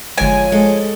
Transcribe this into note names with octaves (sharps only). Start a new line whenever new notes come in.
G1 D3 F3 G#3 C#5 G#5 D7
G#3 A4